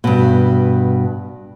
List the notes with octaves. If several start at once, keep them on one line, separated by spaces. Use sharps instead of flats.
G2 B2